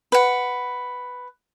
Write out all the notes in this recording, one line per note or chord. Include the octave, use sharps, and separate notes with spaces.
B4 F#5